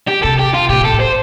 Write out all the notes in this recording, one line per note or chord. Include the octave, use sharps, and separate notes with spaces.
G4
C3 A4
G4
F4
A#2 G4
A#2
A4
A2
C5